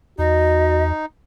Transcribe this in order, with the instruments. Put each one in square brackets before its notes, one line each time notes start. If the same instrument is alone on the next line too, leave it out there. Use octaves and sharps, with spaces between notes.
[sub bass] E2 [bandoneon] D#4 [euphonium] F#4 [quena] D#5